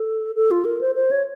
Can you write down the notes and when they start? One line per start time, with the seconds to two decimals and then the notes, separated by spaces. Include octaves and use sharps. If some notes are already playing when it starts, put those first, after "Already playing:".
Already playing: A4
0.35 A4
0.51 F4
0.65 A#4
0.81 C5
0.95 C5
1.11 C#5